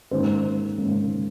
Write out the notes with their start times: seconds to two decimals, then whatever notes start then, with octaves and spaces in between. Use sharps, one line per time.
0.11 G#2 D#3 A#3 C#4 C5
0.78 G#2 D#3 A#3 C#4